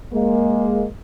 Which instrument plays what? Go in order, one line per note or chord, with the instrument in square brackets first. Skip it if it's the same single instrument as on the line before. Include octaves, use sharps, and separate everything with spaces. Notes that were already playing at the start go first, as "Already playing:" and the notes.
[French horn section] G#3 A#3